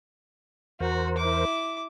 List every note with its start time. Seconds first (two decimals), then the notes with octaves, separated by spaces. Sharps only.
0.80 E2 F#4 A#4 C5
1.18 E4 D6